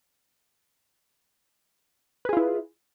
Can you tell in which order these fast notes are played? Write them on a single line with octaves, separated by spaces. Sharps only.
B4 G#4 F4 E4